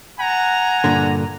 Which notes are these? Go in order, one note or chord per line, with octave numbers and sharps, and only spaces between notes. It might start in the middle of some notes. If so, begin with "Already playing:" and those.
F#5 G#5 A#5
G2 A#2 D3